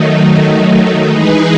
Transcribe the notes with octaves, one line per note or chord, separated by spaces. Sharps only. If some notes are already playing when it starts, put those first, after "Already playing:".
Already playing: D#3 F#3 A3 D#4
E3 G#3 D#4 G#4 B4